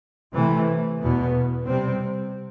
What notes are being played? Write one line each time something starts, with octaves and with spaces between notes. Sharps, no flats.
C3 E3 A3
E2 B2 B3
C3 G3 C4